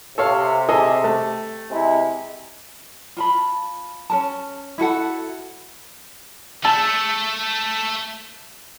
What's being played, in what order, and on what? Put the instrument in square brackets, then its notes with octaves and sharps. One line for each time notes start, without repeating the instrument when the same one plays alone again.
[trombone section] C3 [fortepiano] A4 C#5 F5
[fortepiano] G#4 A4 D#5
A3
[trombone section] C3 G#3 E4
[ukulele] F4 A5 B5
C#4 A#4 A5
E4 F#4 A4 F#5
[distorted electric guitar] A3 [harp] A5 E6